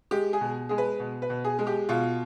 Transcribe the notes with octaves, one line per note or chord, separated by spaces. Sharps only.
G#3 G4
G#4
B2
G#3 G#4
B4
B2
B4
B2
G#4
G#3
G4
B2 F4